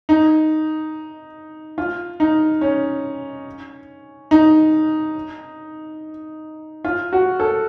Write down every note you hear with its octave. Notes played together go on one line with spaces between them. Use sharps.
D#4
F4
D#4
C#4
D#4
F4
F#4
A4